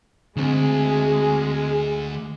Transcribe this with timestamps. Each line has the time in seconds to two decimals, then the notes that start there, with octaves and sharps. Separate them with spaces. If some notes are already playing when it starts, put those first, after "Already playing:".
0.37 D2 D3 G#3 C4 G#4